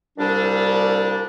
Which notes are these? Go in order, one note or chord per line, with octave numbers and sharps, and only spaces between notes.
C2 A#2 G3 D4